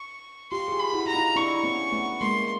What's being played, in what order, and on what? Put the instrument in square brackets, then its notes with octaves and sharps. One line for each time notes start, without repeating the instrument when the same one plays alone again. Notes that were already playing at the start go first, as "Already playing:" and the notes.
Already playing: [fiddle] C#6
[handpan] F4 G4 [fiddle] C6
[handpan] G#4
F4 G4
[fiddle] B5
[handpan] E4 F#4
[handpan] F#4 [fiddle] A#5
[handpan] D#4 F4
[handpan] D4 E4 [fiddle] C#6
[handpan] B3 C#4
A3 B3
[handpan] G#3 A#3 [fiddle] C6